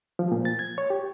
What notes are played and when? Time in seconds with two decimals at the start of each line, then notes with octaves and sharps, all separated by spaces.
0.19 F3
0.32 A#2
0.45 A6
0.59 G#6
0.78 C#5
0.90 G4